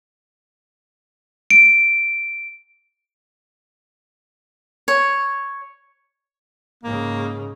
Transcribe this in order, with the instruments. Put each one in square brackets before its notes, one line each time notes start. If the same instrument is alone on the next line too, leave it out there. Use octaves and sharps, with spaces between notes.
[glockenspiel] D7
[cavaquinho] C#5
[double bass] G#2 C#3 [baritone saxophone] A#3